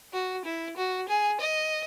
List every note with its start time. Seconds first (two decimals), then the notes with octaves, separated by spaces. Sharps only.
0.13 F#4
0.46 E4
0.77 F#4
1.09 G#4
1.40 D#5